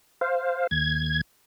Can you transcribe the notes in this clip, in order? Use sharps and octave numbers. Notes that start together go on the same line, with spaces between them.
C5 F5
D#2 G#6